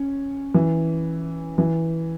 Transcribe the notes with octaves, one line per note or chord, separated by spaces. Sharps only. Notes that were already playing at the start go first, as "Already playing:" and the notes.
Already playing: C#4
E3
E3